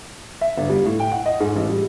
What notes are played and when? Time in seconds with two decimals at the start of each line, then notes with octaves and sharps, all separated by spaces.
0.41 E5
0.58 G1
0.70 G3
0.85 A2
1.00 G5
1.12 F#5
1.26 D#5
1.40 G#2
1.56 A1
1.69 G3